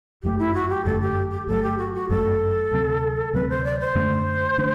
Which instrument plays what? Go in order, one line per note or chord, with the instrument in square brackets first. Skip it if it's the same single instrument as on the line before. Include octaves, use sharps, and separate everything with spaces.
[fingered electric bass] G1 F#2 D3 A3 [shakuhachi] G4
[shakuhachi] E4
F#4
G4
[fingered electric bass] G1 F#2 D3 A3 [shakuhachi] A4
[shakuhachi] G4
G4
[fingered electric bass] G1 F#2 F#3 A3 [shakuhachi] A4
[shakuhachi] G4
F#4
F#4
[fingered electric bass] G1 F#2 F#3 A3 [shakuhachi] A4
[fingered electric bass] D2 C3 F#3 C4
[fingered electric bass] D2 C3 F#3 C4 [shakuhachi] B4
[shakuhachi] C5
D5
C5
[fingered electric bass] F#2 D3 A3 D4
D3 A3 D4